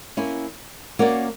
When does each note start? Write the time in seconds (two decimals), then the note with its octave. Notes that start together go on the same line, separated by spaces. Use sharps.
0.17 A#3 C#4 E4
0.99 A#3 C#4 F#4 A#4 D5